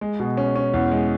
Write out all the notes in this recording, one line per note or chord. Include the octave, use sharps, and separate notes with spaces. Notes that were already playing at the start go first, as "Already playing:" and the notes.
G#3
B2
C#4
C#4
E2
G#3